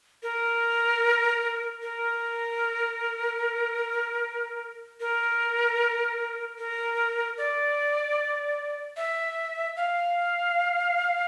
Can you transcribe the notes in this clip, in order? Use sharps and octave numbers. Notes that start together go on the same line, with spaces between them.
A#4
A#4
A#4
A#4
D5
E5
F5